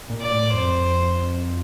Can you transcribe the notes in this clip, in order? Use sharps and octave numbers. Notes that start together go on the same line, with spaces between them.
A#2
D5
A2
F2 C5